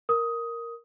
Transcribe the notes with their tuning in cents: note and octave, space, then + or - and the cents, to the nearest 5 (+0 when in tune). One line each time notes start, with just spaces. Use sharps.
A#4 +0 D#6 +10